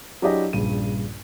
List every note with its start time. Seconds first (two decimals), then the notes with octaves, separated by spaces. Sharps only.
0.22 F#3 D4 E4 G4 G#4 D#5
0.53 A#1 G2 C#3 D#7